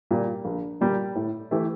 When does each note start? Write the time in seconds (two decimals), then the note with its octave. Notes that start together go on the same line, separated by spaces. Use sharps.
0.11 A#2 G3
0.45 A#1
0.81 A#2 G3
1.15 A2
1.51 E3 A3 E4 G4